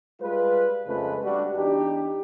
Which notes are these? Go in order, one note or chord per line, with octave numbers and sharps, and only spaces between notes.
G3 G#3 F4 B4
F2 C#3 F3 G#3 A3 B4
G3 D4 F#4
E2 D4 D#4 G4